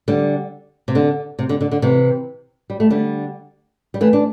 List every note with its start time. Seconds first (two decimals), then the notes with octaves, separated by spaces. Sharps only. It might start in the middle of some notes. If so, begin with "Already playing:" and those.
0.08 D3 G3
0.88 C3
0.95 D3
1.39 C3
1.49 D3
1.61 D3
1.72 D3
1.82 C3 E3
2.70 G3
2.80 A3
2.90 D3 G3
3.94 G3
4.01 E3 A3
4.13 D4